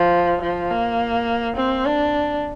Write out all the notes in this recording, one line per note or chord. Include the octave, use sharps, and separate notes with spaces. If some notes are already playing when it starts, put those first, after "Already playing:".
Already playing: F3
F3
A#3
C4
D4